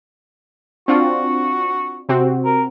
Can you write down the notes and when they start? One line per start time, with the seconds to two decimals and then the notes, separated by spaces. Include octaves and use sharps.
0.88 C4 D4 F4 F#4
2.09 C3 C4 F#4
2.45 A#4